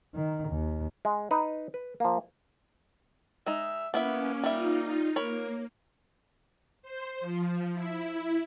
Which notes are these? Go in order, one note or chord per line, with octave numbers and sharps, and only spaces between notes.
D#3
D#2
G#3
D#4 B4
B4
F3 A#3
G#3 D#4 E5
A#3 B3 C#4 E4 E5
G3 D#4 F4 E5
A#3 A#4 C#5 B5
C5
F3
E4